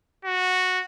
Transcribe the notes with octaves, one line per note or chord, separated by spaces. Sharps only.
F#4